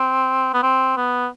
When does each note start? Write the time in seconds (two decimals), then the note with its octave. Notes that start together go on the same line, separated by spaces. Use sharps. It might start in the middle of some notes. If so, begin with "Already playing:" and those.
Already playing: C4
0.54 B3
0.63 C4
0.97 B3